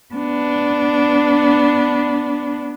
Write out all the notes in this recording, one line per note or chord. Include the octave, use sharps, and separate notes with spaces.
B3 D4